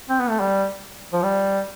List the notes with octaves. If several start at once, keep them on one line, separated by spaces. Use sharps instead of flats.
C4
B3
A3
G3
F3
G3